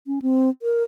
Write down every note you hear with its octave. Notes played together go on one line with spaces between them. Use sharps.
C#4
C4
A#4